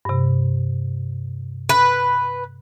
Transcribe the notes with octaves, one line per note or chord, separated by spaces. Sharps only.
G2 C3
B4